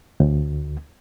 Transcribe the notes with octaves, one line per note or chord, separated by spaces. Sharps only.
D2